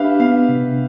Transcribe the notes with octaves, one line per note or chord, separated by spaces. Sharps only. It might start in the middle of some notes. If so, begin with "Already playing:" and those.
Already playing: D4 G4 B4 E5 F5
B3 F5
C3